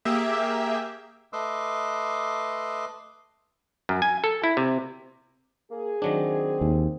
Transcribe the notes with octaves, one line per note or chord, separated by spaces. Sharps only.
A#3 G4 G#4 E5
A3 B4 D#5 C6 D6 E6
F#2
G#5
A4
E4
C3
A#3 G#4
D#3 F#3 C4 D4
D#2